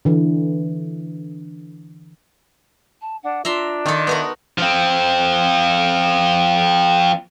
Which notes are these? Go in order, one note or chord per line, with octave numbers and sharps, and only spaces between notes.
D3 E3
A5
D4 F#5
D4 F4 E5 A#5 C6
D#3 F4 A4
B3 F#4 A#4 E5
F3 C4